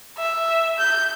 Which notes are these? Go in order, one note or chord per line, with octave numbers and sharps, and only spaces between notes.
E5
G6